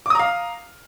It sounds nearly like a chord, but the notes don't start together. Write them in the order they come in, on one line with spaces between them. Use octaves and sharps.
D6 D#6 A#5 F5